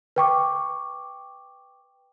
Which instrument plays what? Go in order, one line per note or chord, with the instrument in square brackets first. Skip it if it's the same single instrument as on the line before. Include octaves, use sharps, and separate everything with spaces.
[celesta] B4 G5 C#6 D6